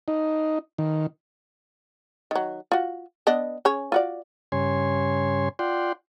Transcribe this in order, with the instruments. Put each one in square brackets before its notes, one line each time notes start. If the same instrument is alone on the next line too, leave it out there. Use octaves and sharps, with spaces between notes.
[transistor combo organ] D#4
D#3
[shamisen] D#3 F#3
F4 F#4
B3 D4 D#5
C#4 G#4 C#5
F4 F#4 D5
[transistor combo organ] G2 C#3 C#5 G#5 C6
F4 D5 F#5 G5 C6